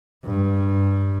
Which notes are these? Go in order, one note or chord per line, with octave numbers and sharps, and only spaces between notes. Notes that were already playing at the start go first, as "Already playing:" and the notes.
G2